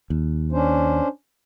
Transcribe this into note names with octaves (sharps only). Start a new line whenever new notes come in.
D#2
C#4 D4 C5